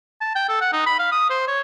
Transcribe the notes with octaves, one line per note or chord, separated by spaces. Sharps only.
A5
G5
A4
F#5
D#4
B5
F5
D#6
C5
C#5